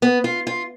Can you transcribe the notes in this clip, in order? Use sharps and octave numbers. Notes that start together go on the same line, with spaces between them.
B3
F4
F4